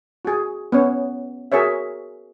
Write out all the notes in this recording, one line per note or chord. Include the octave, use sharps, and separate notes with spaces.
F#4 G#4
B3 C#4 C#5
F#4 G#4 A#4 C#5 E5